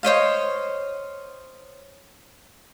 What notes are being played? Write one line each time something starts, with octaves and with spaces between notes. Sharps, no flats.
C5 C#5 D#5 F5